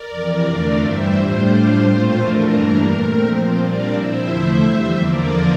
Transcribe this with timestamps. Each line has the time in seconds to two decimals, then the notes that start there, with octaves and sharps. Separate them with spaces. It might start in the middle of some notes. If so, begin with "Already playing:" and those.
Already playing: A#4 D5
0.10 F2 C3 E3
0.45 E2 D3 A3 D4 F4
0.79 G2 E3 G3 C5 E5
1.14 A2 G3 D4 F4 C5
1.50 A2 G3 D4 F4
1.84 A#2 A3 C4 F4
2.18 F2 E3 A3 D4 F4 A#4
2.53 G2 E3 G3 A#3 D4
2.88 A#2 A3 C4
3.22 A#2 F3 C4 C5
3.57 A#2 G3 D4 F4 A#4 D5
3.92 C3 F3 C4 E4 C5 E5
4.27 E2 D3 F3 A3 E4
4.61 F2 E3 G3
4.95 E2 D3 F3 A#3 F4 A#4 D5